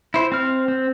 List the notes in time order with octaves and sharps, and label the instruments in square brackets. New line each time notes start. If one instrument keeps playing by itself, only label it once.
[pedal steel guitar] E4 C5
C4 F6
C4